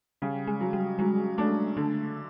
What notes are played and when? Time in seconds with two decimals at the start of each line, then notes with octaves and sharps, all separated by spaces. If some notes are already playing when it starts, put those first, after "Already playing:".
0.22 C#3 G3
0.47 G#3
0.61 F#3
0.73 G3
0.99 F#3 G#3
1.38 A3 D4
1.77 D3 A3